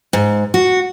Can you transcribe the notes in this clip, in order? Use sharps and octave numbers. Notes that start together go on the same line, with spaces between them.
G#2
F#4